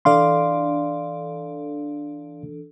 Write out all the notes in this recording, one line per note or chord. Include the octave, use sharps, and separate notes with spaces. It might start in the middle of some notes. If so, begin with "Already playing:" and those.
E3 D4 A4 D5 F5 C6